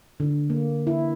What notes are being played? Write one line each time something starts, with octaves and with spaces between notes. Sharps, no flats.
D3
A#3
E4